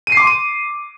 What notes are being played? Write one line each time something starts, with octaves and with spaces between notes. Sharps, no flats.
D#7
C7
D6
C6
D#7